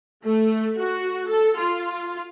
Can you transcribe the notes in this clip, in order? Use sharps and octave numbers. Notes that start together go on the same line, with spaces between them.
A3
F#4
A4
F4